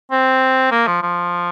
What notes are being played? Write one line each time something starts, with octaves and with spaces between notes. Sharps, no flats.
C4
A#3
F3
F3